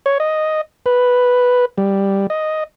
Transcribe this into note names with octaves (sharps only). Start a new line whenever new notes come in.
C#5
D#5
B4
G3
D#5